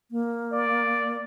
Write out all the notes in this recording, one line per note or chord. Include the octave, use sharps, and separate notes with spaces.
A#3
D5